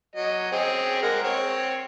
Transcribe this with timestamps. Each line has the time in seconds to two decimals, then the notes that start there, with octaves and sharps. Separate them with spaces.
0.16 F#3 D#5
0.52 C4 C#4 G#4
1.03 G#3 A#4 F#5
1.23 C4 C#5